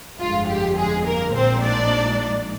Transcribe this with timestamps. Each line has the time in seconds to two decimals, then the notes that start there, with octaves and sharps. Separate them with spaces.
0.19 G1 F2 D3 G#3 F4
0.48 G4
0.77 G#3 G#4
1.06 A#3 A#4
1.35 A#1 A#2 F3 G#3 C4 D#4 C5
1.64 D4 D5